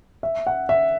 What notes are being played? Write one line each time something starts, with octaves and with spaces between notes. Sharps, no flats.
E5
F#5
E5